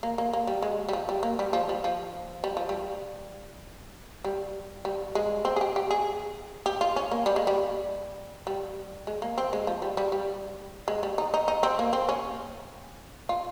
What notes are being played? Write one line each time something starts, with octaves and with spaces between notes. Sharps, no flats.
A#3
A#3
A#3
G3
G#3
G3
F3
G3
A#3
G3
F3
G3
F3
G3
F3
G3
G3
G3
G#3
C4
G#4
G4
G4
G#4
G4
F4
C#4
A#3
G3
G#3
G3
G3
G#3
A#3
C4
G#3
F3
G3
G3
G3
G#3
G3
D#4
D#4
D#4
C4
A#3
C4
C#4
F4